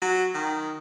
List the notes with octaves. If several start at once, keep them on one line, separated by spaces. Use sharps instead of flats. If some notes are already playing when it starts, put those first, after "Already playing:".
F#3
D#3